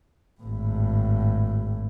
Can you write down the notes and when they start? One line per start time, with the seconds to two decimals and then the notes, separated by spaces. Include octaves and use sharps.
0.41 G#1 A2